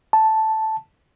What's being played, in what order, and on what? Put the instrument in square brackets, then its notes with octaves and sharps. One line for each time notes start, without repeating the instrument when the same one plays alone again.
[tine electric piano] A5